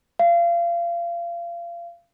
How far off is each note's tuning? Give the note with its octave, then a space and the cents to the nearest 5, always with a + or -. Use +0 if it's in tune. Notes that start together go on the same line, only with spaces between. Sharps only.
F5 -30